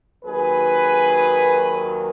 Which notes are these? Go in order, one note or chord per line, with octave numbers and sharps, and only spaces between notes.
D#2 D#3 F#3 G#4 B4